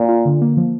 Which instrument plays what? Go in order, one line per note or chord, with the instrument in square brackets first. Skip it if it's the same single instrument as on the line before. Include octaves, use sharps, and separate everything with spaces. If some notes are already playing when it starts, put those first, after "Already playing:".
Already playing: [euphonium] A#2
[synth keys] F4
D3
A#3
F3